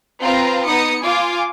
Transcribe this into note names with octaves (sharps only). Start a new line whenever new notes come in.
C4 F4 B4 F5 A#5
B3 D#4 D#6 C#7
F4 G#5 D6